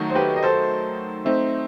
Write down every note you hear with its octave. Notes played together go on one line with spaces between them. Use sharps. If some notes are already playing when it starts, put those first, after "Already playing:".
Already playing: D#3 F#3 A3 D#4 F#4
C5
G4 B4
D#5
A4 C5
A3 C4 D#4 C5 E5